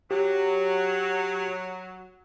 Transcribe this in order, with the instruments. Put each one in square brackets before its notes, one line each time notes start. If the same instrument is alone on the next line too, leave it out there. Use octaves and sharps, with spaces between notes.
[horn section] F#3 [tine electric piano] G4